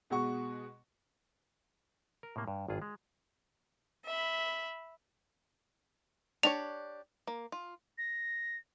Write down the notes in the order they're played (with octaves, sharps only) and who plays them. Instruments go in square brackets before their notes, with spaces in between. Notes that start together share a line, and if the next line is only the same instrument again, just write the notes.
[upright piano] B2 G#3 F#4 C#6
[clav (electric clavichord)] A#4
A2 C3 A#3
G2
G#1 G2 F4 G#4
G#3
[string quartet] E5 B5
[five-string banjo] D4 G4 C#5 [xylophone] F7
[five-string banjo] A#3
F4
[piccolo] A#6